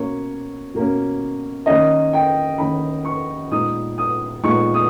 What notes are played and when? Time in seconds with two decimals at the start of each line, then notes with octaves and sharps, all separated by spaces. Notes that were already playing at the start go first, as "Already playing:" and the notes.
Already playing: B2 A#3 C#4 C#5
0.75 B2 A#3 C#4
1.66 D#3 A#3 C#4 D#5
2.13 G5
2.58 D#3 A#3 C#4 B5
3.05 C#6
3.51 A#2 G#3 B3 D#4 D#6
3.98 D#6
4.43 A#2 G#3 B3 D#4 C#6
4.74 D#6